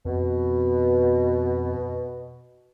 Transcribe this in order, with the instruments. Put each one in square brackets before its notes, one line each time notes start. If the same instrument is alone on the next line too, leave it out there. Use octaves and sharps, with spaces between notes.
[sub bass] F2 [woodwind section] B2